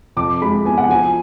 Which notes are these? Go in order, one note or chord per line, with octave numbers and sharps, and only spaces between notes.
F2 D6
G#3 B5
B3 G#5
F#5
F3 G#5